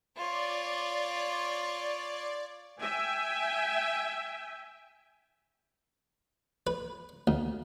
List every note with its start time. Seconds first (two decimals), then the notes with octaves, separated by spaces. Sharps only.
0.17 F4 C#5 D5
2.80 E5 G5 G#5
6.67 B4
7.27 D2